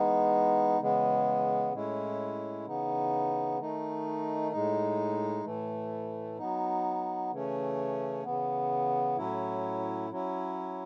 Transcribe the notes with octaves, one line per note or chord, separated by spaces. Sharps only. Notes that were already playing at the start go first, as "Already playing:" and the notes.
Already playing: E3 G#3 B3 D#4
C#3 E3 G#3 B3
A2 G#3 C#4 E4
C#3 E3 B3 D#4
D#3 A3 D#4
A2 G#3 D#4
A2 E3 A3
F#3 B3 D#4
C#3 E3 A3 C#4
C#3 E3 B3
A2 F#3 C#4 E4
F#3 C#4 E4